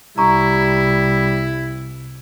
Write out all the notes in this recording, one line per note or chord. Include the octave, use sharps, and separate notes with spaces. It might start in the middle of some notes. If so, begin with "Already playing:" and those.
C2 G3 E4 A#5 C#6